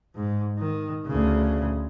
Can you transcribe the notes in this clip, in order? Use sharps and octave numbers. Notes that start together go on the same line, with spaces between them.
G#2
D#3
D2 C#3